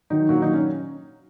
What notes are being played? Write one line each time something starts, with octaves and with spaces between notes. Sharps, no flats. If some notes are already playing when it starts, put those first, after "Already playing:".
D#3 F#3 D#4
A#2 F#3 F#4
D#3 D#4
F#3
C#4